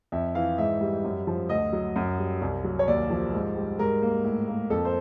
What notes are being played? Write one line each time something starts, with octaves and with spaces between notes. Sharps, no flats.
F2 E5
E3 F5
G#2 E5
G3
F#2
F3
D2 D#5
F#3
F#2
G3
C2
F#3
C#5
D#2 D5
F3
G#2
G3
G#2 A#4
A#3
A2
A#3
F2 A4
C5